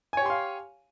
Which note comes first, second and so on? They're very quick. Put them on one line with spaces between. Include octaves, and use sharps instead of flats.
G#5 C#5 G4 C6 F5